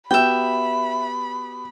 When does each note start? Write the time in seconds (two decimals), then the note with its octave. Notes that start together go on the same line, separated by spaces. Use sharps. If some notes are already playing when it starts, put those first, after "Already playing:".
0.11 B3 F#4 G4 E5 G5 B5